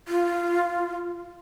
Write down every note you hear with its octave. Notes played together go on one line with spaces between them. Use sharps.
F4